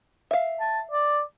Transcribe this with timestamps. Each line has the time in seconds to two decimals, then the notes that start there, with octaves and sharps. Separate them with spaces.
0.31 E5 F5
0.60 A5
0.91 D5